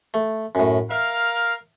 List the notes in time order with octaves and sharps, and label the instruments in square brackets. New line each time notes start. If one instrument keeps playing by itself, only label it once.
[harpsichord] A3
F#2 A2
[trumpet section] A#4 F5 [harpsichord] E5